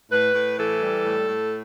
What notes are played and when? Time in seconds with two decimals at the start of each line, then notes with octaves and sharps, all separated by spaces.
0.11 A2 B4
0.34 A2
0.58 E3 A4
0.81 G3
1.05 A2
1.28 A2